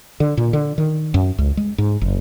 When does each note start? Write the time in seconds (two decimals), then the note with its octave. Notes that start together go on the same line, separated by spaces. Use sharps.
0.20 D3
0.37 A#2
0.53 D3
0.78 D#3
1.14 F#2
1.38 C#2
1.57 G#3
1.78 G#2
2.01 F#1